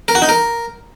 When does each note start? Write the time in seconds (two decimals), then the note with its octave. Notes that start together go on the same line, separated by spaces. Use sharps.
0.08 A#4
0.15 F#4
0.22 D#4
0.29 A#4